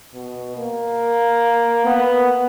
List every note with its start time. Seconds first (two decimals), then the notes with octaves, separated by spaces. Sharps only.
0.14 B2
0.57 A#3
1.85 B3